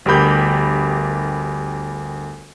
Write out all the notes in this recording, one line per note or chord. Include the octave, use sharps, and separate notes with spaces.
G1 D2 G4 A#4 B5 G6